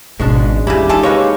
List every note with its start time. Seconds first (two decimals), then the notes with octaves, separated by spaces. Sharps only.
0.20 G#1 B2 G#3 C#4 D4
0.67 E2 C#3 E4 G4
0.89 D#4 F4 G#4 A4
1.03 G#3 A#3 B4 C#5